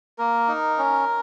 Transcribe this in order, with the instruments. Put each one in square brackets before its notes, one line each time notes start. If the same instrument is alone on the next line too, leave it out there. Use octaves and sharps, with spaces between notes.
[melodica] A#3 A#4
D#4
C#4